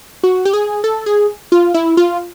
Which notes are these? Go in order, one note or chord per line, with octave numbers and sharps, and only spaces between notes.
F#4
G4
G#4
A4
G#4
F4
E4
F4